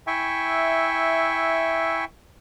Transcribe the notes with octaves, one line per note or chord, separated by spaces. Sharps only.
E4 E5 G5 G#5 C#6